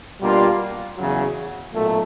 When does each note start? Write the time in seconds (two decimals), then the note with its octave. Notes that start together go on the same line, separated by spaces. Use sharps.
0.20 B2 G3 A#3 D4 F4
0.97 E2 C#3 F#3
1.74 B1 A#2 F#3 A3